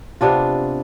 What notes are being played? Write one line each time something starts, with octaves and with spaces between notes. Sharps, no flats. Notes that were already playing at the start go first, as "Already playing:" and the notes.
C3 B3 D4 F4